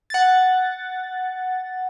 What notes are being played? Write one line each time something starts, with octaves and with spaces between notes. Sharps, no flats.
F#5 A6